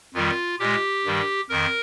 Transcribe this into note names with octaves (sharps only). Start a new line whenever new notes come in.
F2 D#3 G3 F4
A#2 G#3 G4
G2 D#3 G3
F2 D#3 A#4